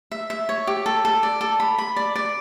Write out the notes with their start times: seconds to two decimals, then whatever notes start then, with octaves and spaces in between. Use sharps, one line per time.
0.12 E5
0.30 E5
0.49 C#5
0.67 G4
0.86 A4
1.05 A4
1.23 D5
1.41 A4
1.60 B5
1.78 B5
1.96 D5
2.16 D5